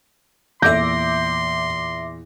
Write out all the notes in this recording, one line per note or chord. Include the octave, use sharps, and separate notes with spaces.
E2 A#2 E5 C6 D6 G6 A#6